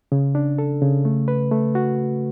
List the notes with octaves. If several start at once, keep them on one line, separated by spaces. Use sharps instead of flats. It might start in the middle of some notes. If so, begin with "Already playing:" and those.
C#3
D4
A4
C#3
A3
B4
A3
F#4